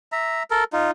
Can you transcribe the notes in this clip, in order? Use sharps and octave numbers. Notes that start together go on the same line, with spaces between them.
E5 A#5
A4 A#4
D#4 F4